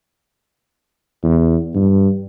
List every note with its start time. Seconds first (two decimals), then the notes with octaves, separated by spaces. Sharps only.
1.24 E2
1.75 G2